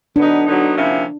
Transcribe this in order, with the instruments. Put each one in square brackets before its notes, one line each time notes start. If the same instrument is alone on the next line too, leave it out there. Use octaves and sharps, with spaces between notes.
[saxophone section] D3 F#3 B3 D#4 [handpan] D4
[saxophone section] D3 F#3 B3 D#4
C3 F3 A#3 C#4 E4